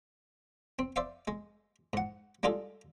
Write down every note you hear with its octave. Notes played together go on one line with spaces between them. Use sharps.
C4
C5 D5 E5 F5
G#3
G#2 F#5
G3 G#3 D4 F4 G#4 A4